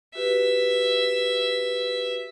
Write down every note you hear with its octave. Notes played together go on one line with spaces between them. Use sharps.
F#4 G4 B4 E5